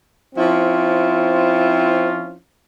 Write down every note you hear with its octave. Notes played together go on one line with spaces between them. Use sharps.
F3 C4 C#4 E4 F4